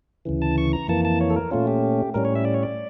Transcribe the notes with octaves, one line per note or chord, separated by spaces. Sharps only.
D2 C#3 E3
A5
C#6
A#5
F2 E3 A#3 A5
A5
C#5
A4
A#4
A#2 A3 C#4 F4
G4
A2 G3 C#4 A#4
C#5
E5
D5
C#5
D5